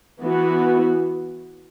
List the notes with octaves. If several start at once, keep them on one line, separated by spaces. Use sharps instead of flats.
E3 B3 F#4